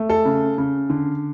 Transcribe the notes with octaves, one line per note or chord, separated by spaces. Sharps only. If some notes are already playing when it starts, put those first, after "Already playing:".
Already playing: A3
A4
C#3
C#3
D3